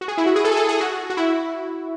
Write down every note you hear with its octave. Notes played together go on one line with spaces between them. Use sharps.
F#4
G#4
E4
F#4
G#4
A4
G#4
A4
G#4
F#4
F#4
E4